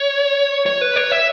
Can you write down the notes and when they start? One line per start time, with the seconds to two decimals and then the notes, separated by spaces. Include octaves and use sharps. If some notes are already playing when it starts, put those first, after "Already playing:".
Already playing: C#5
0.66 C#5
0.81 B4
0.96 C#5
1.11 E5